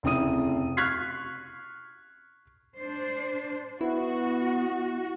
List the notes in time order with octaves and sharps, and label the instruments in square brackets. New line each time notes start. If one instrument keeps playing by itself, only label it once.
[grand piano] F1 C#3 C4 E4 D#6 D#7
C#6 F6 F#6 G#6 B6 C7
[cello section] D4 C5
[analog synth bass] B3 [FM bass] E4 [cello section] F#4